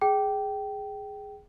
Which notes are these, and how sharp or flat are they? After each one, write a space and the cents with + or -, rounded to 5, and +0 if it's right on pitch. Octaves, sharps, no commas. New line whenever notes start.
G#4 +0 G5 -15